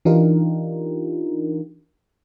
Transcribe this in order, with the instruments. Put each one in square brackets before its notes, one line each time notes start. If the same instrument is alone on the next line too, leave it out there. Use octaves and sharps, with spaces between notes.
[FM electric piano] E3 D4 D#4 F4 G4 A#4